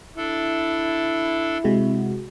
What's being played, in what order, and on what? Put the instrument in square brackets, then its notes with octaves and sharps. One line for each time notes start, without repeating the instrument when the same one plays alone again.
[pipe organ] D4 A4 [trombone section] E4
[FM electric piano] C3 G#3 F#4